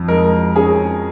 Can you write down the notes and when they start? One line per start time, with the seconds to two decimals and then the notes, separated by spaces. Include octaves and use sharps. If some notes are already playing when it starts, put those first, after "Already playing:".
Already playing: F2
0.08 G#3 A#4
0.56 C#4 G#4